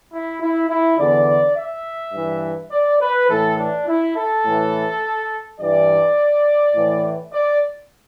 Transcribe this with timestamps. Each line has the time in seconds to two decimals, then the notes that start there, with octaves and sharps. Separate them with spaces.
0.12 E4
0.41 E4
0.70 E4
0.98 E2 D3 D5
1.56 E5
2.13 G2 E3
2.71 D5
3.01 B4
3.29 A2 E3 A4
3.57 D4
3.87 E4
4.15 A4
4.45 A2 E3
5.59 G2 E3 D5
6.75 A2 E3
7.33 D5